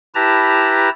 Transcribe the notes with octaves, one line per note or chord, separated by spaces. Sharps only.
E4 G4 B4 A5 A#5